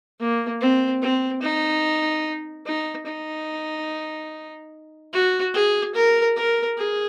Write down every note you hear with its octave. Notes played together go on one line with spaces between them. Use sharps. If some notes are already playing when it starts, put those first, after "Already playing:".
A#3
C4
C4
D#4
D#4
D#4
F#4
G#4
A#4
A#4
G#4